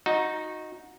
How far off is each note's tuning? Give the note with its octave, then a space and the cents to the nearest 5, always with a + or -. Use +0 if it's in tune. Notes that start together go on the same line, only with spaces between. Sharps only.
D#4 +0 F#4 -20